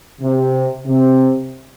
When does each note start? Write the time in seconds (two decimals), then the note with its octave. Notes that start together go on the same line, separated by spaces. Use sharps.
0.21 C3
0.86 C3